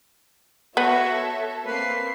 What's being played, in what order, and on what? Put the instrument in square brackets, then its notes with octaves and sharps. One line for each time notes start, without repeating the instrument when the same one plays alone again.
[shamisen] B3 [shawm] F#4 [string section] A4 C#5 E5
[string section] A#3 C4 C7 [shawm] B4